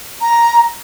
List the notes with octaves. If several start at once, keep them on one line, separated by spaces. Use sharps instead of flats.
A#5